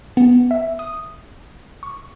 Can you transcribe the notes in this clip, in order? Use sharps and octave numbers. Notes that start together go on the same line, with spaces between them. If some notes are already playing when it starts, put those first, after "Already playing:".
B3
E5
D#6
C#6